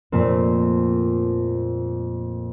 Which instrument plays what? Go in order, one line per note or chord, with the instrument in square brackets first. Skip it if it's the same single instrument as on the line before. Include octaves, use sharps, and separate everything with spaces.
[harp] F2 A#2 A3 C4